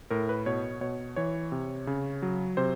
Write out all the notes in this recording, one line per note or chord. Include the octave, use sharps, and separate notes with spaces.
A2 A#4
B4
B2 C#5
B2 C#5
E3 C#5
C3
C#3
F#3
C3 C5